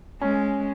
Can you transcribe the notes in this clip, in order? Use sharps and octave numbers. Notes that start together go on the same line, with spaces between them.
G#3 C#4